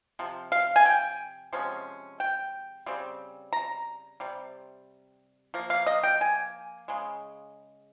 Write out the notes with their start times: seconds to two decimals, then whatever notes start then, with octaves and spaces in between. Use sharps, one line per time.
0.19 C3 F3
0.52 F5
0.76 G#5
0.86 G5
1.53 C3 F3 G#3 C#4
2.20 G5
2.86 C#3 G3 C4
3.53 A#5
4.20 C3 G3
5.54 F3 A#3
5.70 F5
5.86 D#5
6.03 G5
6.21 G#5
6.88 C#3 G#3